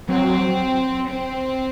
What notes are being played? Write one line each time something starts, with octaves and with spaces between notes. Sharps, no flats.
F#3 C4
C4